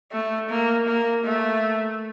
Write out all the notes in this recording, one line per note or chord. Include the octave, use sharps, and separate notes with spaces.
A3
A#3
A#3
A3